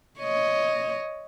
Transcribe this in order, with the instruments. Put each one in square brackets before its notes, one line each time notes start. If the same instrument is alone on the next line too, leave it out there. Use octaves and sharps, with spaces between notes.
[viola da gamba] C#5 D#5